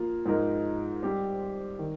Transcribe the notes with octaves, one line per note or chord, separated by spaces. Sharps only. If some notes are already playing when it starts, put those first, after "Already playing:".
Already playing: F3 A#3 F4
G#2 F3 G#3 D#4 A#4
G3 C4 G4 C5
D#3